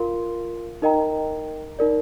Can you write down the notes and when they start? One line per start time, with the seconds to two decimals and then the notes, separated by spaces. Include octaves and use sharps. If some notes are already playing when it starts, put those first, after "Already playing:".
Already playing: F4 A#4 F5 C6
0.82 D#4 A#4 D#5 G5 A#5
1.79 D#4 A#4 D5